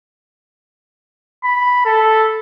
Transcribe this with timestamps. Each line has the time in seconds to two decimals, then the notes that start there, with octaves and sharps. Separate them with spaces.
1.44 B5
1.85 A4